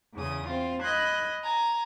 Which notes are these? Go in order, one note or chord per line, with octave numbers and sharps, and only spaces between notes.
E2 C#3 D#6
C4 F4
D#5 B5 F#6 G#6
G#5 A#5